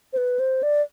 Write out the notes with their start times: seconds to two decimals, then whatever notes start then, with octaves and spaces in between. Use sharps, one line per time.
0.13 C5
0.17 B4
0.39 C5
0.63 D5